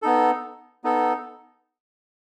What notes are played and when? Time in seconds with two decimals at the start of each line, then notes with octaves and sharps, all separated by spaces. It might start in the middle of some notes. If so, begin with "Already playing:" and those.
0.02 B3 D#4 A4
0.84 B3 D#4 A4